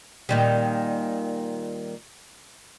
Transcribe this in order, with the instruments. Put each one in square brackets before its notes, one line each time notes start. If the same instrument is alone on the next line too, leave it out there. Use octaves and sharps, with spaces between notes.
[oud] A#2 D#3 G3